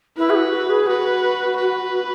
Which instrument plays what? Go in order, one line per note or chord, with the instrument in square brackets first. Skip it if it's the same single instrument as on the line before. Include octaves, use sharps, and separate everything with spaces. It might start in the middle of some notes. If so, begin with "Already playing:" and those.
[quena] E4 [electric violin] B4
[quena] G#4
F#4
F#4
G#4
[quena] F#4 [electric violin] B4
[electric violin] B4